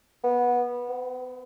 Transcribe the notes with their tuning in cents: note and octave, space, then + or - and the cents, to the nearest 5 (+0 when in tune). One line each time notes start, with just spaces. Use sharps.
B3 -15
B3 +40